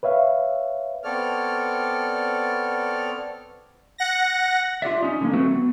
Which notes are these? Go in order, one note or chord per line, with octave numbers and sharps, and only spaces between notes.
B4 C#5 E5 F5
B3 C4 A4 C#5 D5 F6
F#5 A#6
F4 G4 D5 E5
C#4 D#4
D3 G3 A#3
F#3 A3 C4 F#4 B4
B3